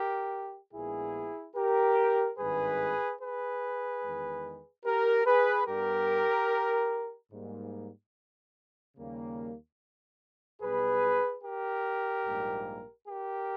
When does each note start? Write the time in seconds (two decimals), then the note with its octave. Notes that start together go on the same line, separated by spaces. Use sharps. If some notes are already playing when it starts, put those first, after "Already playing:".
Already playing: G4 A#4
0.74 A#1 A#2 G#3 B3 E4 G#4
1.56 G4 A#4
2.38 G#1 G2 D#3 G#3 G#4 B4
3.20 G#4 B4
4.03 E2 D#3 G#3
4.85 G4 A#4
5.26 G#4 B4
5.67 G2 G3 B3 G4 A#4
7.32 G#2 G3 A#3
8.97 D#2 C#3 G3 A#3
10.61 B1 B2 G3 B3 G#4 B4
11.43 G4 A#4
12.26 A#1 G#2 G3 A#3
13.08 G4 A#4